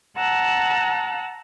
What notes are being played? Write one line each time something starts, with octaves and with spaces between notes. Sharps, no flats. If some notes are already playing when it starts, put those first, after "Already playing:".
F#5 A5 A#5 E6 F#6